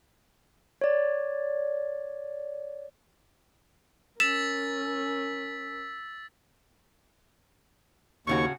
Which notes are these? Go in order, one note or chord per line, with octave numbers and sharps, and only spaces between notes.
C#5 D5
C#4 A#4 E6 A6 B6 E7
D#2 A2 C#3 F#4 C#6